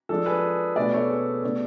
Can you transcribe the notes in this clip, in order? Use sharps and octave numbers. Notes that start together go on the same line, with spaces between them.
F3 G#3 D4 A4
G#4 B4
B2 A3 D4 B4 D5
A4 C#5
G#4 B4
B2 A3 D4 A4